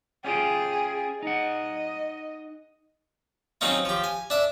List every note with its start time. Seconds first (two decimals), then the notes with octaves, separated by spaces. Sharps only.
0.24 C#4 F4 G4 G#4
1.22 D#4 D#5 F#5
3.61 F#3 C4 C#4 D#4 F4
3.85 F3 G4
4.04 G#5
4.30 D4 E5